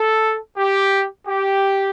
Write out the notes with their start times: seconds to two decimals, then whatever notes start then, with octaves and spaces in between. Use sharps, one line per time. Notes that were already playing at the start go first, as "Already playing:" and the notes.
Already playing: A4
0.58 G4
1.27 G4